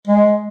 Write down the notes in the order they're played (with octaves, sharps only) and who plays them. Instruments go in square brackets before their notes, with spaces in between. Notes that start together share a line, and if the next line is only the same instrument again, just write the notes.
[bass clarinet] G#3